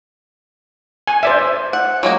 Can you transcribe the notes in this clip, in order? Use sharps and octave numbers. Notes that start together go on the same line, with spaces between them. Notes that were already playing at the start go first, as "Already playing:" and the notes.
G#5
C5 D5 E5
F#5
F#3 G#3 A#3